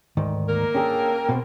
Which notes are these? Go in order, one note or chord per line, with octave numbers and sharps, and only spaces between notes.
D2 G#2 D#3
A#3 A#4
C#4 D4 G#4 A4 G5
B2 C4